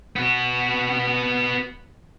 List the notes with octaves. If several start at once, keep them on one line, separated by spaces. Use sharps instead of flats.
B3 F#4